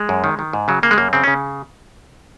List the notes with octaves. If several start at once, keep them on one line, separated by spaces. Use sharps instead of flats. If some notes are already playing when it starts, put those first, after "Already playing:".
Already playing: G#3
F#2
D#3
D#3
G#2
C#3 F#3
C#3 A#3
G#3
F#2 A#3
C#3 C4
C#3 C#4